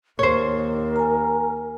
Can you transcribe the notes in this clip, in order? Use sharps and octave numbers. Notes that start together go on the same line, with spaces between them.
D#2 A#4 C5 C#5
G#5 A#5